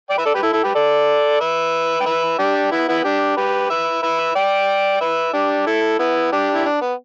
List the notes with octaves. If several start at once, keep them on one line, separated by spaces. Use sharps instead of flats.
D5 G5
B4 E5
A4 D5
G4 B4
E4 A4
E4 A4
G4 B4
A4 D5
B4 E5
G5
B4 E5
D4 G4
B3 E4
B3 E4
D4 G4
G4 B4
B4 E5
B4 E5
D5 G5
B4 E5
D4 G4
E4 A4
B3 E4
D4 G4
E4
D4
B3